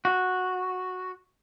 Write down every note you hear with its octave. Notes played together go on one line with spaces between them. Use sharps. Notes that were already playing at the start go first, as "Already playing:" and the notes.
F#4